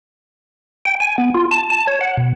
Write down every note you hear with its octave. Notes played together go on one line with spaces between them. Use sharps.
G5
G#5
B3
F4
A5
A5
C#5
F#5
B2